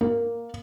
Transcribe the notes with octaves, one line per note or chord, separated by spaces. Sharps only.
A#3